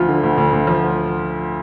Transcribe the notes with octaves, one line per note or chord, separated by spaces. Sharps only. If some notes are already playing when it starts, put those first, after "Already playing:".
Already playing: D2 F3 F4
D3
D2
D2
D2
F3